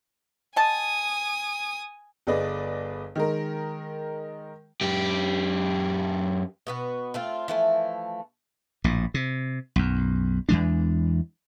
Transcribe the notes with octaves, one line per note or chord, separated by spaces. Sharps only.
D#5 G#5 A5 D#6
G1 G#4 B4 D5 D#5
D#3 G#3 A#4
F#2 G4
B2 B3 F#4
A3 C4 F4
E3 F3 A3
A#1 A2
C3
B1 F#2
E2 E3 G#3 D4